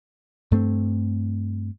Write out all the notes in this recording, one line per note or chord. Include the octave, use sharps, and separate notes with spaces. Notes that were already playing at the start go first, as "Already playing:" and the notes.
G2 A3 C4